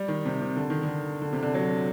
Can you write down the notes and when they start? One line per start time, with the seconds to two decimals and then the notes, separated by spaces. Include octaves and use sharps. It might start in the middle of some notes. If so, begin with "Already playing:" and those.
Already playing: G3
0.08 D#3
0.25 C3
0.41 C3
0.57 D3
0.70 D#3
0.83 D3
1.22 D3
1.33 C3
1.43 D3
1.54 F#3